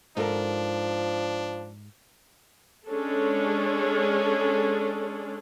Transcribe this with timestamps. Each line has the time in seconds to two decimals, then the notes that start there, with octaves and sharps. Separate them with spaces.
0.17 G#2 F3 D4 A4 A#4
2.87 G#3 C#4 D4 G#4 A4